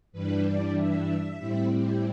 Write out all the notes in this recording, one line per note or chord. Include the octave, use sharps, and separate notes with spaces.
G2 E3 G3 D4 B4
D5
E5
A2 G3 C4 E4
G4